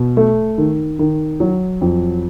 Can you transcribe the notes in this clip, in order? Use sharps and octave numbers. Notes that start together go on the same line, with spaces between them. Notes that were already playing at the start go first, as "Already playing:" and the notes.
Already playing: B2
A3
D#3
D#3
F#3
F2